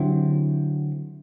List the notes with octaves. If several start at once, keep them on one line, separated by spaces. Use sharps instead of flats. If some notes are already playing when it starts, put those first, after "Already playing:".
Already playing: D3 F#3 C4 E4 G4